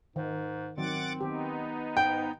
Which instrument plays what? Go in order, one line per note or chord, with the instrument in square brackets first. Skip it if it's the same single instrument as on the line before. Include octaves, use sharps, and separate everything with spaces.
[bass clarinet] G#2 [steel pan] D#3
[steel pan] D#3 F#3 [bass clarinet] C4 [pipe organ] F#5 D6 A6
[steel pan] D#3 G4 [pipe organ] B3 D#4
[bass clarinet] G#2 [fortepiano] G5